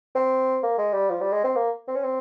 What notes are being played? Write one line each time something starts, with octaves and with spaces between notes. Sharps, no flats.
C4
A#3
G#3
G3
F3
G3
G#3
C4
A#3
C4
C#4
C4